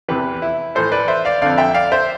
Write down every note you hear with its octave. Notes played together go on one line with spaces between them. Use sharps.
E2 C3 E3 G4 B4
E4
A2 E3 A4 C5
B4 D5
C5 E5
D5 F5
F2 D3 D5 F5
E5 G5
D5 F5
C5 E5